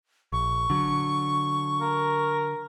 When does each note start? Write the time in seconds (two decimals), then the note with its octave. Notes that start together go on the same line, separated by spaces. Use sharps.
0.33 A#1 C#6
0.70 D3 F#3
1.81 A#4